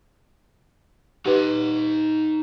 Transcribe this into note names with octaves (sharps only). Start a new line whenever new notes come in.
D#4 G4 B4 F#5